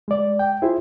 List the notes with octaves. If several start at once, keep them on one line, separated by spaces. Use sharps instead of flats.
G#3 D5
G5
E4 F4 G#4 C5